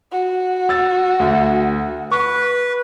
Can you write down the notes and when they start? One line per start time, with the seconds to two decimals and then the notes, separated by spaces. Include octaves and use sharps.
0.12 F#4
0.69 E6 A6
1.20 D2
2.12 B4 C#6